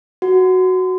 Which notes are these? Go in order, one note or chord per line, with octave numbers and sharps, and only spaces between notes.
F#4